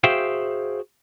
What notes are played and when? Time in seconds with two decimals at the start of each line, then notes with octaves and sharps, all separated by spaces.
0.04 F#4 G#4 C5 E5 F5 G5